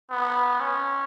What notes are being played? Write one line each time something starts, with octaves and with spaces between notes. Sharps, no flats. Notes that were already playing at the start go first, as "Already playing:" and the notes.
B3
C#4